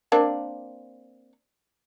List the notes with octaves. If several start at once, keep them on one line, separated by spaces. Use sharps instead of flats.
A#3 C4 D4